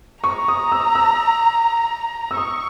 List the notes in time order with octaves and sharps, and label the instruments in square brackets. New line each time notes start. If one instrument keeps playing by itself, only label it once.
[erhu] A#5 [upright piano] C#6
[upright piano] D#6
E6
E6
E6
[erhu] C#6 [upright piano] D#6